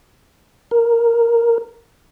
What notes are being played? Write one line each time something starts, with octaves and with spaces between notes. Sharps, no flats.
A#4